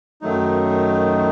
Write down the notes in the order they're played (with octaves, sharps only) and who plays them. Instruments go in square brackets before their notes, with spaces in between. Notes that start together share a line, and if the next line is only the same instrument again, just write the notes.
[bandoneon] F#2 D#3 F#3 A3 D#4